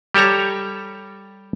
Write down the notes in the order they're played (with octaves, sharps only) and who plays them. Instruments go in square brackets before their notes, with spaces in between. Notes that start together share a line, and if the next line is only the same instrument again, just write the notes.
[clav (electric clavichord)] G3 G4 A4 C#5 A#5